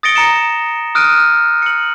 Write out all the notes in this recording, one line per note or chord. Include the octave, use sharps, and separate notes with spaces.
D#6 A6 A#6 C#7 D7 G7
A#5 C#7 E7
D#6 F6 F#6 D7 D#7
C#7 F#7